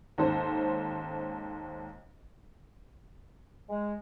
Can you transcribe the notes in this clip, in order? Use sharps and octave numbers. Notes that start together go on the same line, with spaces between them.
D#2 G#2 C#4 A4 C5
G#3